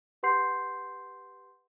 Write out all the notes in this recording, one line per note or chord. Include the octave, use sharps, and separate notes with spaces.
G4 B4 F#5 C6 G6 C7